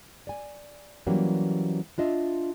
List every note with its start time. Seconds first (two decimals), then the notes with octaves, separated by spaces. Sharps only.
0.27 D5 G#5
1.07 E3 F#3 G3 A#3 C#4 G4
1.98 D4 F4 D#5 E5